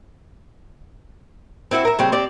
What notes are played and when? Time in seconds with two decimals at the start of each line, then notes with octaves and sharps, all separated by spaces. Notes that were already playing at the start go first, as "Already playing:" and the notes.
1.71 C4 E4 F#4 E5
1.85 A#4 E5
1.99 C#3 G3 C4
2.12 C4 G4 D5